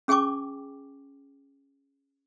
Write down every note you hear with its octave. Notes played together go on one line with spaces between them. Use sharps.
C#4 G#4 G5 G#5 C#6 D6